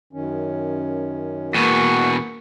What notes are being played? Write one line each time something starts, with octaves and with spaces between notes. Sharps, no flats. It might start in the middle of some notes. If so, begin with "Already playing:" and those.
F#2 D#3 C#4
E2 B2 A#3 F#4 C#6